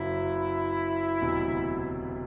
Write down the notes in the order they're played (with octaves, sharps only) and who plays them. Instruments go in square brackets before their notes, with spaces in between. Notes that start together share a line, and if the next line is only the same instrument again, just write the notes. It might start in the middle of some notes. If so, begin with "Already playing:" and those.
Already playing: [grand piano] F#1 F#2 F#3 [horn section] E4
[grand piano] E1 D2 C3 F#3